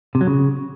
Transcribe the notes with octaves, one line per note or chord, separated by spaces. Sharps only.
C3
F#3
C#3